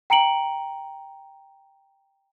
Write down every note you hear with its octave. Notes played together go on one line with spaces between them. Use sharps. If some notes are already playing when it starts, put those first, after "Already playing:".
G5 A#5 C#7 D7 F#7